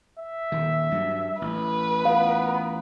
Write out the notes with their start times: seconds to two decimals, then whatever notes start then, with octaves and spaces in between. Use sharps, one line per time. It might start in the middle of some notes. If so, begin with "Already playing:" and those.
0.19 E5
0.52 D#1 D#3
0.91 G2 F#3
1.42 A1 B4
2.05 B3 F5